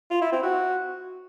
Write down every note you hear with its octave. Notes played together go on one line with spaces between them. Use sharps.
F4
E4
C4
F#4